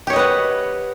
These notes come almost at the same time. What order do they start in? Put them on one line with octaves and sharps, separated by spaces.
G4 C#5 D#5 B4 F#5